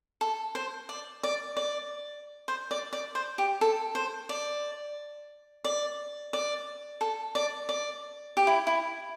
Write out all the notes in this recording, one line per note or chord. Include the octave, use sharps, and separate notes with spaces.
A4
C5
D5
D5
D5
C5
D5
D5
C5
G4
A4
C5
D5
D5
D5
A4
D5
D5
G4
E4
E4